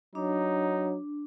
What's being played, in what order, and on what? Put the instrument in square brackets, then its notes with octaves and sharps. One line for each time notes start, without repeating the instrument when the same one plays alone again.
[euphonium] F#3 [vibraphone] D4 [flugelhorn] D#4